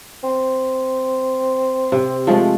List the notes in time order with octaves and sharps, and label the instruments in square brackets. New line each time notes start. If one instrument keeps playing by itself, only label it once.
[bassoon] C4
[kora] C3
F3 G#3 A3